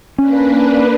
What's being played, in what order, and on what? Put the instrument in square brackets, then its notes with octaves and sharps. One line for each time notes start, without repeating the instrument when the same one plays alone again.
[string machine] A#3 D4 B4 [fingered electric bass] C#4